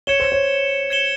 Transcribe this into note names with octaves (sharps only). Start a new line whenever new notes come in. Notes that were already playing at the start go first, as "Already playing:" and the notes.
C#5 G#6 C#7 E7 G7
C5
C#5
G#6 C#7 E7 G7